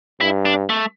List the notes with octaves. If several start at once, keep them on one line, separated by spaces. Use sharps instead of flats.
G2 E4
D4
A3